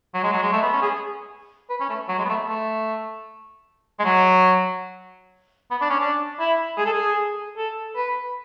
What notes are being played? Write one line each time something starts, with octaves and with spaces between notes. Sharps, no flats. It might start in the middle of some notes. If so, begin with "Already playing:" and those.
F#3
G#3
F#3
G#3
A3
B3
C#4
G#4
B4
C#4
A3
F#3
G#3
B3
A3
A3
G#3
F#3
B3
D4
C#4
D4
E4
G#4
A4
G#4
A4
B4